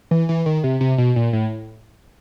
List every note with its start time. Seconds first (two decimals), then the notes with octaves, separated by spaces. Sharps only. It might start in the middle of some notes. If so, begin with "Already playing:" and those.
0.11 E3
0.29 E3
0.46 D#3
0.64 C3
0.81 C3
0.98 B2
1.16 A#2
1.33 A2